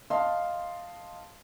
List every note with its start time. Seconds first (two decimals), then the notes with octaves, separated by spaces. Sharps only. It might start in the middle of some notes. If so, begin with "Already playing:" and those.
0.10 D#5 F5 A5 C6